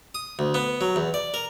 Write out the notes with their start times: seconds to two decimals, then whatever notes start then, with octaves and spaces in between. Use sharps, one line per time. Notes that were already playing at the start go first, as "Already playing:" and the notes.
0.15 D#6
0.39 D2
0.54 B3
0.81 F#3
0.96 E2
1.14 D5
1.34 A#4